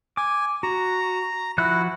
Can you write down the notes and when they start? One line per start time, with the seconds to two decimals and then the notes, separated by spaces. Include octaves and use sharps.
0.17 G#5 D6
0.63 F#4 A#5
1.58 F3 E4 F#4 F#6